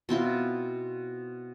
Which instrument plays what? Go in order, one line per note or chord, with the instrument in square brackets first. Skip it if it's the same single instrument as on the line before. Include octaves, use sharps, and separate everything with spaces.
[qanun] B2 C4 E4 F4